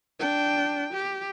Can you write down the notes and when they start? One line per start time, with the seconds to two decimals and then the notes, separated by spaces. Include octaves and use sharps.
0.19 D4 G5
0.94 G4